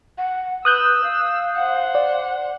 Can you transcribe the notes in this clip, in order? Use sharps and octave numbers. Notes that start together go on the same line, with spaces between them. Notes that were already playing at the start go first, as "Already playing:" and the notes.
F#5
B4 D#6 E6 F#6 G6
F5
C5 F#5
D5